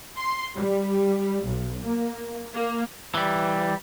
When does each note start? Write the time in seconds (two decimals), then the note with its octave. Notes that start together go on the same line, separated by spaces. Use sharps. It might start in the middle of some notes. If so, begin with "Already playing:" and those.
0.17 C6
0.55 G3
1.44 B1
1.84 A#3
2.54 A#3
3.14 E3 G3